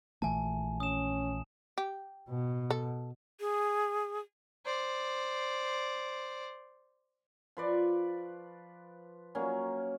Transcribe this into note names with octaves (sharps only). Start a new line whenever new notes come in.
A#1 E3 A3 G#5 A5
C#4 D#6 E7
G4
B2
A4
G#4
C5 D5
F3 B4 D5 C#6
F#3 A#3 C#4